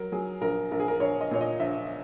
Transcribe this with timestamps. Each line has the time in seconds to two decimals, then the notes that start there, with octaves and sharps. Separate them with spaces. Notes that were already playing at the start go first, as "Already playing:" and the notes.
Already playing: F#3 A#4
0.12 F#3 G#4
0.41 A#1 A#4
0.71 A#1 A#4
0.80 G#4
0.88 A#4
1.00 A#1 C#5
1.21 D#5
1.31 A#2 C#5
1.41 D#5
1.60 A#1 E5